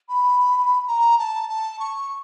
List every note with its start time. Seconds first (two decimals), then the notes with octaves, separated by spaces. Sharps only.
0.09 B5
0.87 A#5
1.18 A5
1.49 A5
1.79 C#6